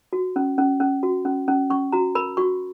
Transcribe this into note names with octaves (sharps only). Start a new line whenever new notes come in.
F#4
C#4
C#4
C#4
F#4
C#4
C#4
C#4 C#6
F#4 A#5
A#4 B5
F#4 C#6